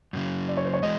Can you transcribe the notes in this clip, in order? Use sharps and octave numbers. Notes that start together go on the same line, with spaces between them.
F#2 C#3 F#3
D5
C#5
C5
C#5
E3 G#3 D#5